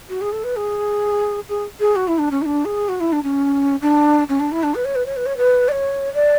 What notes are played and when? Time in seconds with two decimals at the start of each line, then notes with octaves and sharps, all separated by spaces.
0.10 F#4
0.21 G#4
0.32 A4
0.44 B4
0.56 G#4
1.49 G#4
1.80 G#4
1.96 F#4
2.08 E4
2.18 D4
2.31 C#4
2.42 E4
2.46 D4
2.65 G#4
2.89 F#4
3.00 E4
3.12 D4
3.24 C#4
3.82 D4
4.29 C#4
4.40 D4
4.52 E4
4.63 D4
4.75 B4
4.85 C#5
4.95 B4
5.06 C#5
5.16 B4
5.26 C#5
5.37 B4
5.68 D5
5.72 C#5
6.14 D5